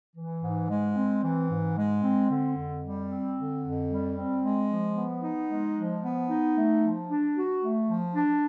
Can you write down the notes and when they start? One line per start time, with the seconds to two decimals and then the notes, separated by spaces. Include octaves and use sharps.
0.16 E3
0.42 G#2
0.69 G#3
0.96 C4
1.23 E3
1.49 G#2
1.76 G#3
2.03 C4
2.29 D3
2.56 F2
2.82 G3
3.09 C4
3.36 D3
3.62 F2
3.89 G3
4.15 C4
4.42 G#3
4.68 F3
4.95 B3
5.22 D#4
5.49 G#3
5.75 F3
6.02 B3
6.28 D#4
6.55 A3
6.82 F3
7.08 D4
7.36 F#4
7.62 A3
7.88 F3
8.15 D4